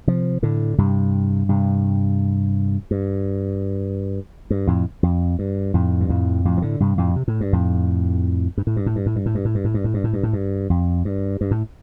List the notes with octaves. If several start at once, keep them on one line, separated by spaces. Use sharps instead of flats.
C3 F3
A2 D3
G2 C3
G2 C3
G2
G2
F2 A2
F2
G2
F2 A2
G2
F2 A2
F2 A2
F3
A2 D3
G2 C3
F2 A2
C3
A2
G2
F2 A2
G2
A2
G2
A2
G2
A2
G2
A2
G2
A2
G2
A2
G2
A2
G2
A2
G2
A2
G2
F2
G2
G2
A2